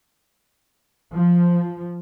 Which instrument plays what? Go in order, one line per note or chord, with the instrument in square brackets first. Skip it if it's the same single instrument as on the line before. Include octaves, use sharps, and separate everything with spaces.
[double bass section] F3